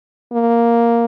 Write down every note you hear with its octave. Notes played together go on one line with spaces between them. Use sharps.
A#3